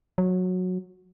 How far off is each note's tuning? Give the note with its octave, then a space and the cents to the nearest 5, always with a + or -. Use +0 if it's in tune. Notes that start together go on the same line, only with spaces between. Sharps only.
F#3 -15